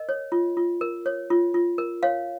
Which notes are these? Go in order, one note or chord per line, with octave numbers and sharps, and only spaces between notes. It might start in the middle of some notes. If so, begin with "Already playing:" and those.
Already playing: A#4 D#5
C#5
F4
F4
A#4
C#5
F4
F4
A#4
C#5 F5